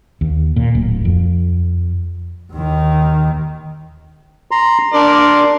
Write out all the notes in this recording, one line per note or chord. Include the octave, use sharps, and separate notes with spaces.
D#2
A#2
D1
F2
D#2 D#3
A#5 C6
D4 A#4 D5 C6